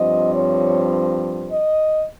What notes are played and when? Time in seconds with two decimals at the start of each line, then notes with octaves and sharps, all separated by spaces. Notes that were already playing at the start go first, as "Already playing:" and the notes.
Already playing: G2 F3 C4 D#5
0.34 C#5
1.50 D#5